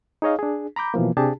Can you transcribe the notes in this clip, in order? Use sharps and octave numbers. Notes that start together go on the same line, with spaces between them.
D#4 G#4 C#5 D#5 F5
D4 G#4
A#5 B5 D6 G6
B2 E3 F3 A#3
C3 D4 G4 G#4 A5